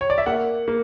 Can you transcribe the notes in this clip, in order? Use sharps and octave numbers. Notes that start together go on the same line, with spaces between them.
C#5
D5
E5
A#3 F#5
A#3